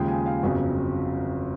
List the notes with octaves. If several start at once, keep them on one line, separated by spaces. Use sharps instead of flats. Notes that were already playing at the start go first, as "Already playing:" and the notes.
Already playing: D#2 C#3 F3 G#3 G5
G#5
F5
G1 F2 C#3 F#3